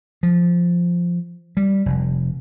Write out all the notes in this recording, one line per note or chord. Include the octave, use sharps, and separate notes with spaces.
F3
G3
F1